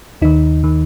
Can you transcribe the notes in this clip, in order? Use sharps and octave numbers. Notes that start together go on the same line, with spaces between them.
D#2 D#3 D#4
D#3